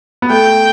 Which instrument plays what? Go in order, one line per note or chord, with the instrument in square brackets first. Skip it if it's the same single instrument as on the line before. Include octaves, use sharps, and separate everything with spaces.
[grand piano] B3
[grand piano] A3 [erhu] G5